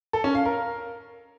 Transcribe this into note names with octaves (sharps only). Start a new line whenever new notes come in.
A4
C#4
F5
A#4